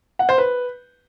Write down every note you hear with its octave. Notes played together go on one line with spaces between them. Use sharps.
F#5
C5
B4